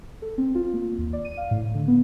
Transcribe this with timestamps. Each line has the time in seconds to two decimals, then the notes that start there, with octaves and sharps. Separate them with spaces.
0.22 A4
0.38 C4
0.55 F4
0.74 A#3
0.98 D#2
1.13 D5
1.25 D#7
1.37 F5
1.51 A2
1.74 D3
1.88 B3